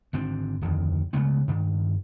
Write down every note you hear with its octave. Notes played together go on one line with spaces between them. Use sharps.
G#1 D3 C4
D1 F2 D#3
C#3 G#3 A3 B3
G2 D#3